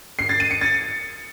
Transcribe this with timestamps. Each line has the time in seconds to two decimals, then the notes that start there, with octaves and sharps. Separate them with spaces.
0.19 C7
0.29 A6
0.40 D#7
0.51 C#7
0.61 A6